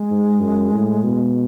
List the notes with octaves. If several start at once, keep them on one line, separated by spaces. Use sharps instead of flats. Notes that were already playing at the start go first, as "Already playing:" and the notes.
Already playing: G#3
G#2
F#2
A2
B2